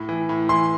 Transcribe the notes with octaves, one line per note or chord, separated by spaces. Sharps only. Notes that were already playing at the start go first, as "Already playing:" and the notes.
Already playing: A2
E3
A2
E3 C6